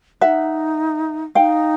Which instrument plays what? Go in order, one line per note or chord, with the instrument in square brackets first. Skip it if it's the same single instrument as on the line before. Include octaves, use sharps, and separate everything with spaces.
[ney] D#4 [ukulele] E5 F#5
[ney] D#4 [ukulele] F5 G5